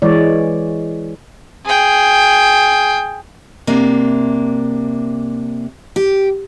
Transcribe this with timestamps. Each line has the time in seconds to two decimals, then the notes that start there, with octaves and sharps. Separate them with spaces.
0.02 E3 G#3 C#5 D5
1.65 G#4 G5
3.67 C3 A#3 D4
5.96 G4